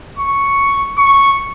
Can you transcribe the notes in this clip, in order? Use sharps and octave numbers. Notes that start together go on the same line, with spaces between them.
C#6
C#6